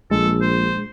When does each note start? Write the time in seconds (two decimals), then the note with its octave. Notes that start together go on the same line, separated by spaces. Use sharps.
0.11 A#1 G#3 A4
0.41 C5